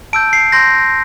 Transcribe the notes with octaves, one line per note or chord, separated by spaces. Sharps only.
A5 E6 G6 D7
C7
C6 G6 A#6